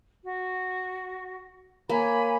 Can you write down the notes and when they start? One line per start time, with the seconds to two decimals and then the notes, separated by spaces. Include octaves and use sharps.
0.24 F#4
1.89 A#3 C#5 G#5 B5